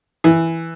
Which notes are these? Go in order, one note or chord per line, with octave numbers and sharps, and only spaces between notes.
E3